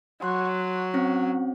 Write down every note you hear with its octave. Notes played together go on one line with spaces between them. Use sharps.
F#3 C6 F#6
C4 C#4